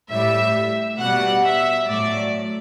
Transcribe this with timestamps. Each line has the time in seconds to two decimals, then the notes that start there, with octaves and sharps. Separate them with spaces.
0.10 A2 G3 E5
0.99 B2 G3 F#5
1.43 E5
1.87 A2 F#3 D5